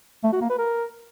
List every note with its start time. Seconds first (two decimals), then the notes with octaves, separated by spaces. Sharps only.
0.24 A3
0.32 F#4
0.41 A#3
0.50 B4
0.58 A#4